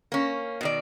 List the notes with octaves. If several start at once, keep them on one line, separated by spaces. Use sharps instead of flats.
A#3 C#4
B2 D#3 D5